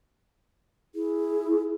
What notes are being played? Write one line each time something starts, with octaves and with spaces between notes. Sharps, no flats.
E4 G#4